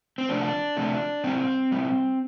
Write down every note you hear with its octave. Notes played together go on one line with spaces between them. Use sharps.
C4
C3 F3 A3 D4
C3 F3 A3
A#2 G3 C4
A#2 G3